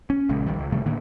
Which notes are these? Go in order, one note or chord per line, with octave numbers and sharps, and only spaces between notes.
C#4
A#1 C#3 G#3
A#1 D#2 D#3 G3
C#2
C3 D#3 G3 A3
A2 D3 D#3 A#3